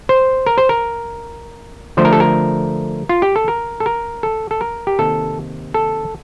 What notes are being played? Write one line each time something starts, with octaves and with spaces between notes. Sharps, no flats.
C5
A#4
C5
A#4
D3 F3 A3 C5
A#4
A4
A#4
F4
G4
A4
A#4
A4
A#4
A4
A4
A#4
G4
C3 D#3 A#3 A4
A4